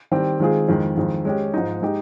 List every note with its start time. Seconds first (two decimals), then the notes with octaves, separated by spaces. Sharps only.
0.11 D#3 G3 C4 G4
0.40 D#3 G#3 C4 F4 G#4
0.68 F2 D#3 G#3
0.97 F2 D#3 G#3
1.25 G#3 C#4 G4
1.54 G#2 F3 G#3 D#4
1.82 G#3 D#4 G4